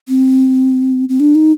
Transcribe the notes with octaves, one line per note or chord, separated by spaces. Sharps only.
C4
C4
D4
D#4